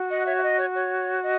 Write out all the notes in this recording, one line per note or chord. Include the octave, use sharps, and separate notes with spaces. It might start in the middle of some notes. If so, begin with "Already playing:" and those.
Already playing: F#4
D#5 F#5
C#5 E5
E5
D#5
C#5
C#5
D#5